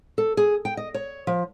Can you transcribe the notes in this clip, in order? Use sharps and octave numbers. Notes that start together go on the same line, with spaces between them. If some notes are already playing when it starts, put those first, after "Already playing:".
A4
G#4
G5
D#5
C#5
F3